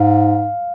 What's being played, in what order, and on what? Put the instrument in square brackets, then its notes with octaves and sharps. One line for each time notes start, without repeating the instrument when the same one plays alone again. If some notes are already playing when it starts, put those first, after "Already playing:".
Already playing: [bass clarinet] G#2 [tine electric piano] F5